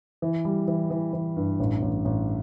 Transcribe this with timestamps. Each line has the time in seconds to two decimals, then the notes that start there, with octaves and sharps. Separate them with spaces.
0.22 E3
0.45 G3
0.68 E3
0.90 E3
1.13 E3
1.36 G2
1.60 A1
1.82 A1
2.05 A1